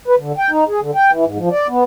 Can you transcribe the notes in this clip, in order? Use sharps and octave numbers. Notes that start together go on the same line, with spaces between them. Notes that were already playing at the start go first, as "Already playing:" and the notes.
B4
D3
G5
D#4
G#4
D3
G5
E3
G#2
F3
D5
B3